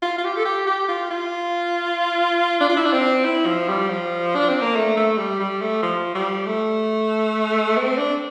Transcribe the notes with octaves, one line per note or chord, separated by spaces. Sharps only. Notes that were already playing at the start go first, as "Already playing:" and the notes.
F4
F4
G4
A4
G4
G4
F4
F4
D4
F4
E4
D4
C4
E4
F3
G3
F3
D4
C4
A#3
A3
A3
G3
G3
A3
F3
G3
A3
C4
D4